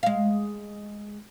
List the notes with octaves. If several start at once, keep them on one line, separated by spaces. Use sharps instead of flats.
G#3 F5